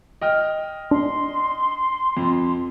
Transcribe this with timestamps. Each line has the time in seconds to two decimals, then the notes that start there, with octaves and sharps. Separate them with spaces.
0.22 D#5 G5 F6
0.91 D4 C6
2.17 F2